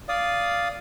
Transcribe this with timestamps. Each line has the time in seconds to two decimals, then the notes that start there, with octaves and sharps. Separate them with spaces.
0.09 D5 F5 D#6